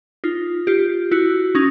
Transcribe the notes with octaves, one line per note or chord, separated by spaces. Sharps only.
D#4 F4
F4 G4
E4 F#4
C#4 D#4